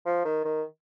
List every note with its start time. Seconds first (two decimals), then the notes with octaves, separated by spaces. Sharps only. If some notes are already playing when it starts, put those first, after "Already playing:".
0.06 F3
0.25 D#3
0.45 D#3